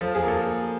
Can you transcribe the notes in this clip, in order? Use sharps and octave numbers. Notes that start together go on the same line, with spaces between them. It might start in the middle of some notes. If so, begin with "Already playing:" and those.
F3 A4
G#4
A#3
A4